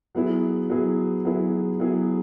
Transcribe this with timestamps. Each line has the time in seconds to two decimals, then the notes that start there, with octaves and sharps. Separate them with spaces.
0.15 F#3 B3 E4 G#4
0.70 F#3 B3 E4 G#4
1.25 F#3 B3 E4 G#4
1.80 F#3 B3 E4 G#4